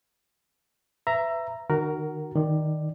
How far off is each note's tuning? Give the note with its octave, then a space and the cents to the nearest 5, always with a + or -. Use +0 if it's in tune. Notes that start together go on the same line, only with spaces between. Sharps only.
B4 +20 E5 +20 A#5 +0
D#3 -30 F#4 +25 A#4 +0
D#3 +0 D5 +10